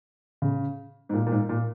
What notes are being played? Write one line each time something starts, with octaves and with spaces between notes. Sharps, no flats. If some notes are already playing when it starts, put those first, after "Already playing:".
C#3
G#2
A#2
A#2
G#2
A#2